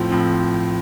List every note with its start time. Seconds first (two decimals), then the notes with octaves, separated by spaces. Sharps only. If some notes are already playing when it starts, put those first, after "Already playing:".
Already playing: A2 F3 C4
0.10 A2 F3 C4